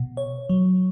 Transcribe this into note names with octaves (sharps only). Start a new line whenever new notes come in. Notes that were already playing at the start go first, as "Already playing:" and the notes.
Already playing: B2
C#5
F#3